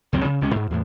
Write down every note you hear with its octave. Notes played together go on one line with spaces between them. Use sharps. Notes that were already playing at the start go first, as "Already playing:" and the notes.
C#2 F#2 F#3 C4
C#3
C#2 C3 G#3 C#4
G#2
E2 A2